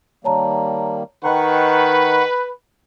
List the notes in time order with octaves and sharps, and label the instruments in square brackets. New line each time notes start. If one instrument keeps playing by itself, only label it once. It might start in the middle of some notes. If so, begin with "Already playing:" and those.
[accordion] D#3 G3 A#3 [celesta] C#5 A5 A#5
[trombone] D#3 [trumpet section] B4 [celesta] D#5 G5 A#5 [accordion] F#5 C#6